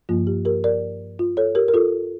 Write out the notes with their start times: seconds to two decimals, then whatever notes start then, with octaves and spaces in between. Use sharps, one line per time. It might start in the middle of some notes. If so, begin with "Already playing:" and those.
0.09 G2 F3 A#3 F4
0.27 G4
0.45 G4 A#4
0.64 A#4 D5
1.19 F4
1.37 A4 C#5
1.55 G4 A#4
1.68 A#4
1.74 F4 A4